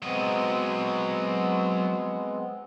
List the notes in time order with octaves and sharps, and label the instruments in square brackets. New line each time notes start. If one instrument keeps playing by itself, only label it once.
[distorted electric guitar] F#3 D#5 [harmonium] G#3 B3 C4